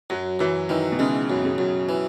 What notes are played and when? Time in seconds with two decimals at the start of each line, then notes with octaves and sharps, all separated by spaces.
0.10 F#2 F#3
0.39 F#2 E3
0.69 D#3 E3
0.92 B2
0.99 C#3 G#3
1.30 F#2
1.44 C#3
1.58 F#2
1.89 E3